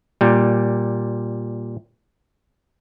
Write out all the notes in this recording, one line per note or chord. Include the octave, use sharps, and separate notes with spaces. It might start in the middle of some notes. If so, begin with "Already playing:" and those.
A#2 G3